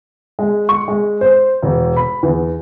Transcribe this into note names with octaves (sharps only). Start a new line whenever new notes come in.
G#3
C#6
G#3
C5
E1
B5
E2